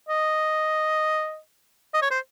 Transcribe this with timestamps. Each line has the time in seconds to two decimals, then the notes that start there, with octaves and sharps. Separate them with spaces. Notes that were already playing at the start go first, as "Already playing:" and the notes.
0.09 D#5
1.94 D#5
2.02 C#5
2.11 C5